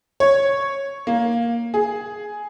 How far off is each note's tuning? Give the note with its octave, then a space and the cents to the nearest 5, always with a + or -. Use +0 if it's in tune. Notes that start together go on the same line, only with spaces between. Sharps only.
C#5 -5
A#3 +5
G#4 +5